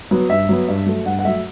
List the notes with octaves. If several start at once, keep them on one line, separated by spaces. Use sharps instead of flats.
F#3 B3
G2 E5
F#3 B3
G2
F#3 A3
G2 F#5
F#5
F#3 A3 E5